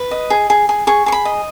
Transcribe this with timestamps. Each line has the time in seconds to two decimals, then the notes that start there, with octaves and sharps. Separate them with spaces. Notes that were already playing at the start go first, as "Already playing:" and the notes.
Already playing: B4
0.11 D#5
0.30 G#4
0.50 G#4
0.69 G#4
0.87 G#4 C#6
1.06 G#4 C#6
1.12 B5
1.25 D#5